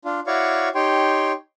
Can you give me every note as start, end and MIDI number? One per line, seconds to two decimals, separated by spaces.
0.05 0.20 62
0.05 0.20 65
0.27 0.69 64
0.27 0.69 66
0.27 0.69 73
0.27 0.69 74
0.27 0.69 77
0.27 0.69 85
0.75 1.32 63
0.75 1.32 67
0.75 1.32 73
0.75 1.32 79
0.75 1.32 84